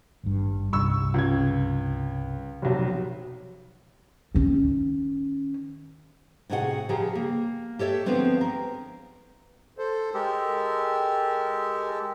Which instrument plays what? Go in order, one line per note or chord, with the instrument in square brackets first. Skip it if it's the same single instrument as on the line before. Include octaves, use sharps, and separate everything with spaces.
[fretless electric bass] G#1 G2
[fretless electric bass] C2 G2 [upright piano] C#6 E6
[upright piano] C#2 G#6
F1 B1
[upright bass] D#3 C#4
[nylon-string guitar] A2 C3 F#4 G#4 C#5 F#5
C#3 F3 G4 G#4 A#4
A#3
G4 A4 C#5 E5
D3 F3 A3 B3 C4 D4
A#4
[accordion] A4 C5
[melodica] G#3 G4 A4 [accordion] A#4